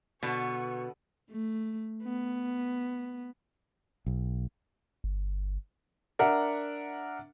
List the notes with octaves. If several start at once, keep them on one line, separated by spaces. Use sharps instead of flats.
B2 D3 B3 A5 C#6
A3
B3
B1
G1
D4 A#4 E5 F#5